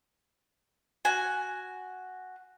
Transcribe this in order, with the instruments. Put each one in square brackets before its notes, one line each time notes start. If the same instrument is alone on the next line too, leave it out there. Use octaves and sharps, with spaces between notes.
[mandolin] F#4 G#5